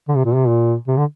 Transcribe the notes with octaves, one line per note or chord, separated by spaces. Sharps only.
D3
C3
A#2
C3
A#2
C3
D3